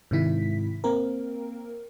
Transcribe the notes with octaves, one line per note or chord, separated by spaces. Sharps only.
G#2 C3 D#3 E4 B6
A#3 C4 A#4